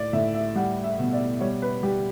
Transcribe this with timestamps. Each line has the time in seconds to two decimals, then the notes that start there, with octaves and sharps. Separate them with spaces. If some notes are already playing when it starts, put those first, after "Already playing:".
Already playing: A2 D5
0.13 A2 E5
0.34 E5
0.55 G3 F#5
0.84 E5
0.99 B2
1.13 D5
1.41 G3 C#5
1.62 B4
1.83 G3 G4